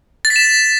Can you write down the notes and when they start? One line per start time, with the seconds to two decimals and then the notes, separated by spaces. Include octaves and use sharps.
0.25 A6
0.30 B6
0.36 E7